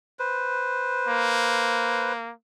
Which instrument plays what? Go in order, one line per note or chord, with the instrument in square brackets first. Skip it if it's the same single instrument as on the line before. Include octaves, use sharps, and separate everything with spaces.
[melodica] B4 C5
[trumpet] A#3